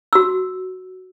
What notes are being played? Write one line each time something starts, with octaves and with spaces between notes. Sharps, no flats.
F#4 E6